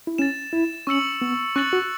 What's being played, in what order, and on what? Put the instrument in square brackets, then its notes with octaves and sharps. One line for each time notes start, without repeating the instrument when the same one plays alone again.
[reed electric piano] E4
[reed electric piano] C#4 [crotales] A6 E7
[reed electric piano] E4
[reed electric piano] C#4 [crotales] C#6 E6 C#7 F#7
[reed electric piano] B3
[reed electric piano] C#4 [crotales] C#6 F#6 A6 C#7 F#7
[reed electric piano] F#4